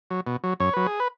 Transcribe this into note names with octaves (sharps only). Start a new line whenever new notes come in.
F#3
B2
F#3
F#2 C#5
F#3 B4
G#4
B4